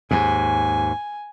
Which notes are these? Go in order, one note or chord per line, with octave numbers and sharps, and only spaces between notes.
D#2 G#2 G#5